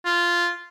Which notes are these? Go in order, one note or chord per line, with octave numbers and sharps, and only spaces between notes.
F4